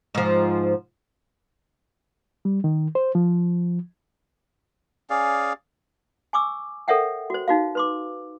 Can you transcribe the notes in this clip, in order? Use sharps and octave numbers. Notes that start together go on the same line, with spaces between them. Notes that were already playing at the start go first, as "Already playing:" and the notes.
G#2 F3
G3
D#3
C5
F3
C#4 G#4 D5 F5
G#5 C#6 D6 E6
A4 A#4 C#5 E5 F#5 G5
F#4 C5
D#4 F#4 F5
B4 C6 D6